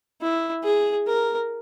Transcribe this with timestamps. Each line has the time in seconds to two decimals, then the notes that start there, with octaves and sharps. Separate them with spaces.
0.21 E4
0.64 G#4
1.07 A#4